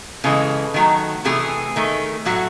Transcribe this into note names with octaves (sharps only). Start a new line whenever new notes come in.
C#3 E3 G#3 A4
D#3 F#3 A3
C3 E3 A3 G#4
D#3 A3
A2 F#3 A3 F#4